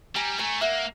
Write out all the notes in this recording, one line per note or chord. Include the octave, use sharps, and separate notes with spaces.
G3 G#5 A#5
A3 G#5 A#5
A#3 E5 F#5